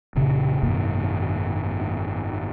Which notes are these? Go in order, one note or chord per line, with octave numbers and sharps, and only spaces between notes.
F1 A#2 C#3
G#1 F#2 B2 A#3